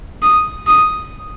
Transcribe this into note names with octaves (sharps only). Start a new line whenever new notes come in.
D#6
D#6